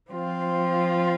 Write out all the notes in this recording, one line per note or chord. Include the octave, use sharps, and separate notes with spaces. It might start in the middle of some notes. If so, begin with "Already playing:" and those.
F3 C4 F4